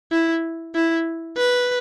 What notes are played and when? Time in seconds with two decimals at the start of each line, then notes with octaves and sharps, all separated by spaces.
0.12 E4
0.75 E4
1.37 B4